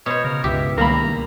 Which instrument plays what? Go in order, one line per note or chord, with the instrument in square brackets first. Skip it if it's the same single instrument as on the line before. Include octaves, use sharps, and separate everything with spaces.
[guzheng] B2 C5 [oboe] C#5
[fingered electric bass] C#3 [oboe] A#4
[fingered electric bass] C#2 G2 C#3 [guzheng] G4 [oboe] E5
[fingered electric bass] C#2 D#3 G3 [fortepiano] A#3 B5 [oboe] A#5